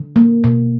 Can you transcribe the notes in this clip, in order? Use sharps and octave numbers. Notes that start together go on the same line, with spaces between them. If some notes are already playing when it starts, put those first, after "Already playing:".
Already playing: D3
A#3
B2